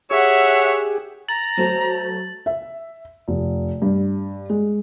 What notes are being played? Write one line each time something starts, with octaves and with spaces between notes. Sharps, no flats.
G4 G#4 C#5 E5 F#5
A#5 A6 F#7
F#3 A3 C5
E5
F1
G2
G#3